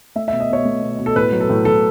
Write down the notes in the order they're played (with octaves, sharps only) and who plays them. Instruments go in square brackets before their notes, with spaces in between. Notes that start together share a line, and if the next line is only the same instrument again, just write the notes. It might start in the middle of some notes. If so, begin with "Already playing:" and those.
[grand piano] A3 E5
E5
B2
D#5
B2 C#5
A3
B2
B2
A4
A2 B4
F#3
A4
A2
A2 A4